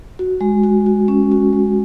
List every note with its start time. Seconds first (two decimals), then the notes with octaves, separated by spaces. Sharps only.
0.19 F#4
0.41 G#3
0.63 F#4
0.86 F#4
1.08 C#4
1.32 F#4
1.53 G#3